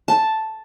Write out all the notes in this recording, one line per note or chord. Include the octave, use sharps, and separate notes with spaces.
A5